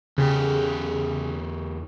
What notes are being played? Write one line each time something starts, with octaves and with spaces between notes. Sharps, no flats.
E2 C#3 G4